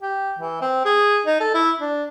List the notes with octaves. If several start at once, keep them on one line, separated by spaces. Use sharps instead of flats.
G4
E3
C4
G#4
D#4
A4
E4
D4